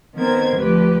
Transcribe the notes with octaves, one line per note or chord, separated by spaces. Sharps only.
D#3 B3 C4 A#4 C5 G#6
D2 F3 G4 B4